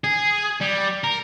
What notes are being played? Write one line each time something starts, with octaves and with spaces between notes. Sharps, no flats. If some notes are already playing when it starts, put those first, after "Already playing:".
G#4
G3
A#4